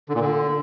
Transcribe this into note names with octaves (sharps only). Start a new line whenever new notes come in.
D3
A#2
D3